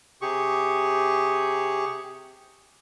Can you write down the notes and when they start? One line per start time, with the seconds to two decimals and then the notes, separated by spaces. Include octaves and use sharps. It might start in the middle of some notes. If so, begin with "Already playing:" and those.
0.22 C3 G4 G#4 C#6